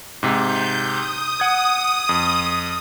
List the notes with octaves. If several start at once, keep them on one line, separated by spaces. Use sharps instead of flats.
G#2 C3 G6
D#6
F#5 G#6
F2